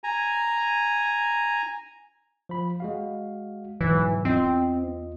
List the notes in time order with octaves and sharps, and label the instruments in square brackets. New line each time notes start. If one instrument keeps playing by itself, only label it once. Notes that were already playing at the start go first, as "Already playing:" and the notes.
[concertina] G#5 A#5
[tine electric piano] F3 B5
G#3 F#4 F5
[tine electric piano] G#2 B2 F#3 [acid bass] E3
[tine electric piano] E2 F4 D#5 [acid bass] C4